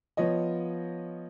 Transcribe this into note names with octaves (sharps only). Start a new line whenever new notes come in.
F3 B3 F4 C#5 D#5